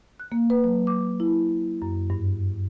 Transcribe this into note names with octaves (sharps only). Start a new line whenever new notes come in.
F#6
A#3
B4
F#3
D6
E4
F#2
G2